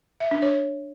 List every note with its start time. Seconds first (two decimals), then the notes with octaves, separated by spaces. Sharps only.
0.20 E5
0.31 D4
0.42 C#5